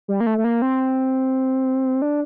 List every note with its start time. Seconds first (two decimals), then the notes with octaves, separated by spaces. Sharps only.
0.08 G3
0.20 A#3
0.27 A3
0.38 A3
0.44 A#3
0.62 C4
2.02 D4